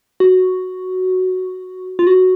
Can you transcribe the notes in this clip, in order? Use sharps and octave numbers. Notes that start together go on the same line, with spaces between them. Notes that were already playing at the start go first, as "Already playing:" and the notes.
F#4
F4
F#4